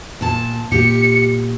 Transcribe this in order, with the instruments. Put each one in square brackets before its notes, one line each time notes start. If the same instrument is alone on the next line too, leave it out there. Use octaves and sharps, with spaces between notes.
[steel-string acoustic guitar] A#2 A5
[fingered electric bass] A#2 [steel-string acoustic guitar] G4 [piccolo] C#7